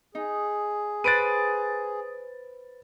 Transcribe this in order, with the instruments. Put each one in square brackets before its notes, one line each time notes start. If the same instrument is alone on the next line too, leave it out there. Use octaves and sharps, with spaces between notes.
[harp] D#4 [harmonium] G#4
[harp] B4 C5 F#6 [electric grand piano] A6 D7 D#7